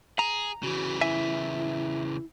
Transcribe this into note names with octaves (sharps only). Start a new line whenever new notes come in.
G#4 A#5
C#3 E3 F#4
E4 E5 G#5